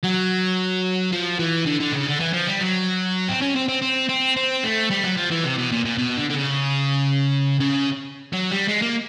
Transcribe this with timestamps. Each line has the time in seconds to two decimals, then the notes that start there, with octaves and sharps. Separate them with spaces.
0.04 F#3
1.12 F3
1.39 E3
1.66 D3
1.80 D3
1.93 C#3
2.07 D3
2.20 E3
2.33 F3
2.47 G3
2.61 F#3
3.28 C4
3.41 C#4
3.55 C4
3.68 C4
3.82 C4
4.09 C4
4.37 C4
4.64 A3
4.90 G3
5.04 F#3
5.17 F3
5.31 E3
5.44 C3
5.58 B2
5.72 A#2
5.85 A#2
5.98 B2
6.17 D3
6.30 D3
6.34 C#3
7.60 C#3
8.33 F#3
8.51 G3
8.68 G#3
8.82 A#3